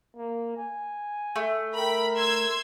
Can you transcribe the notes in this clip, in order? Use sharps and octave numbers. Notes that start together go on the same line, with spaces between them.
A#3
G#5
A3
A#4 G5 B5
C6 E6 G#6